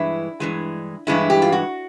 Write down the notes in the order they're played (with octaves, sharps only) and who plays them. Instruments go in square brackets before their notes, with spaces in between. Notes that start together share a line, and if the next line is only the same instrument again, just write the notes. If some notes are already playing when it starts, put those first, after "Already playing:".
Already playing: [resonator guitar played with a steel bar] G2 E3 G#3 E4
G2 E3 G#3
G2 E3 G#3 E4
G4
F4
F#4